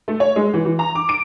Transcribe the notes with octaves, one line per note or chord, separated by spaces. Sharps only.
A3
C#5
G#3
E3
E3
A#5
D6
D7